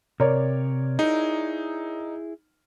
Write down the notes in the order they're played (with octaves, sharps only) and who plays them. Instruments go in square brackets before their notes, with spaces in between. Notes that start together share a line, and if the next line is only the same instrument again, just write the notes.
[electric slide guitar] C3 [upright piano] A#4 C#5 D5
[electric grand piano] D#4 [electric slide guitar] E4 G#4